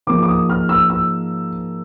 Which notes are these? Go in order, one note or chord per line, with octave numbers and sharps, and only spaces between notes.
G#2 F3 A#3 D6
D6
D#6
F6
E6
E6